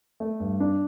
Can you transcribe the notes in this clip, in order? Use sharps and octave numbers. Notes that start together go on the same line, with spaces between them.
A3
G2
D4